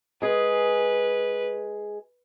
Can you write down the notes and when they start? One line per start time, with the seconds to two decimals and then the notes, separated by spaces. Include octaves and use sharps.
0.22 G#3 G#4 B4